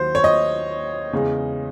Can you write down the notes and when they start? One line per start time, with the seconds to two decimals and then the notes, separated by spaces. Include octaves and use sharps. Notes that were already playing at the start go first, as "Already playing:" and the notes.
Already playing: D#2 D#3 F#3 C5
0.15 C#5
0.24 D#5
1.13 E2 C#3 G#3